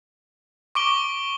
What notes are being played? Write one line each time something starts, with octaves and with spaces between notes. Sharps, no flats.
C#6 D6 D7 G7